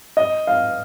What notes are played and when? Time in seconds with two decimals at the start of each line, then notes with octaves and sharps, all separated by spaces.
0.17 D#5
0.47 F5